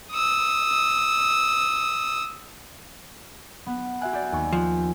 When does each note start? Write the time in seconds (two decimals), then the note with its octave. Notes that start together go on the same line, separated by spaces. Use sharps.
0.11 D#6 E6
3.66 B3
4.01 F#4 E5 G#5 F#6
4.13 G4 D5
4.32 D#2 G#5 C#6
4.53 F3